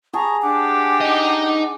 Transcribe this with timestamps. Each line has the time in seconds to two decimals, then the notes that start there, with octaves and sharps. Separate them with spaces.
0.13 G#4 A5 A#5 C#6
0.42 D4 G4 F#5 D6
1.01 D#4 D#5